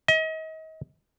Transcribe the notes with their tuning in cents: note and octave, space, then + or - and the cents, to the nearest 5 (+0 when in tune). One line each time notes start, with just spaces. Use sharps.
D#5 +35